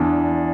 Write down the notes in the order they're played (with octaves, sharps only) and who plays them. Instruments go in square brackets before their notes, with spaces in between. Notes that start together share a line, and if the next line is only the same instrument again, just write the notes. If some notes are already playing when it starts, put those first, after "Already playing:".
Already playing: [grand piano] E2 E3 B3 [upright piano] D4